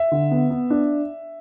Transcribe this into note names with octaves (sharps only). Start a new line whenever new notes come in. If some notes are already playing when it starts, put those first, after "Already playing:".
Already playing: E5
D3
B3
B3
D4